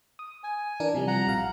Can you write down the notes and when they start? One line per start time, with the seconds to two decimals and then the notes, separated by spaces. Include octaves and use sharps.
0.19 D#6
0.44 G#5
0.80 E3 D4 A#4
0.94 C3 F3 G3
1.07 F#5 A#5
1.27 A#1 F5